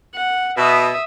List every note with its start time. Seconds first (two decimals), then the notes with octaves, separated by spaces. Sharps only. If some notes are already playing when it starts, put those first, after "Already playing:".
0.15 F#5
0.58 B2 E5 D#6